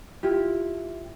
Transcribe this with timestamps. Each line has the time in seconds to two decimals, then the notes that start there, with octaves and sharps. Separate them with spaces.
0.23 E4 F4 G4